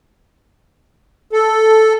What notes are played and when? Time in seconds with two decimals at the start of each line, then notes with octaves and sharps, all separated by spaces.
1.33 A4